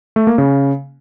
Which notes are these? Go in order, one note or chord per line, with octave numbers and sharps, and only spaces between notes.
A3
A#3
C#3